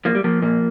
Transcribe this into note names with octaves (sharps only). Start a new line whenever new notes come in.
F3 A#3
G3
F3 A#3
A#2 A#3